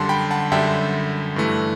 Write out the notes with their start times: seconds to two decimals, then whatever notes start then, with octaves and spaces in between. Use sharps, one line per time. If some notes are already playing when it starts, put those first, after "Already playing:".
Already playing: F#2 D3 G3 A5 C6
0.09 G5 B5
0.31 F#5 A5
0.52 F#2 D3 G3 E5 G5
1.36 G2 E3 A3